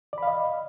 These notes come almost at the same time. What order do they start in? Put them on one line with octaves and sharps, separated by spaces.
D5 B5 F5 D#5